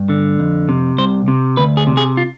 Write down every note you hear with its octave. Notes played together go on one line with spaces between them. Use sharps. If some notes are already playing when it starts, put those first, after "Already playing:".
Already playing: G2
D3
F2
C3
C2 C5
C3
D2 B4
G#4
C3
G#4
F4